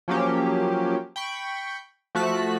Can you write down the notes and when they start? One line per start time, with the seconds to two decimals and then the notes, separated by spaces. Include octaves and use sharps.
0.08 F3 F#3 A#3 C#4 G4
1.16 G5 B5 C#6
2.15 F3 A3 F#4 A5 F#6 B6